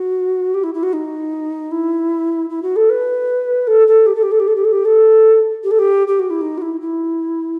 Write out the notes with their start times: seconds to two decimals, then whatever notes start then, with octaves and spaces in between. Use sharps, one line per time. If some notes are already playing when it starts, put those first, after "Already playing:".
Already playing: F#4
0.54 G4
0.63 E4
0.74 E4
0.83 F#4
0.93 D#4
1.71 E4
2.49 E4
2.62 F#4
2.76 A4
2.89 B4
3.67 A4
3.87 A4
4.06 G4
4.15 A4
4.22 G4
4.31 A4
4.39 G4
4.47 A4
4.55 G4
4.64 A4
4.72 G4
4.85 A4
5.63 G4
5.71 A4
5.78 G4
6.07 G4
6.19 F#4
6.30 E4
6.41 D#4
6.57 F#4
6.61 E4
6.80 E4